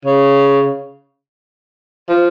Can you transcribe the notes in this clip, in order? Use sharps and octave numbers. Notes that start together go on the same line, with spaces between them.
C#3
F3